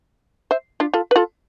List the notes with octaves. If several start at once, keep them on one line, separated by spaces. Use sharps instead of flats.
C5 E5
D4 F4
F4 A4
B4
F4 A4